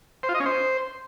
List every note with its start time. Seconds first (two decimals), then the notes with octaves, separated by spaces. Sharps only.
0.23 C5
0.29 F4
0.34 D#5
0.40 C#4
0.46 C5